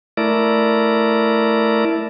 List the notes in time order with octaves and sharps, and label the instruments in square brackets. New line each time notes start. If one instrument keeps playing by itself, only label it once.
[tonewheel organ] A3 E4 A#4 D5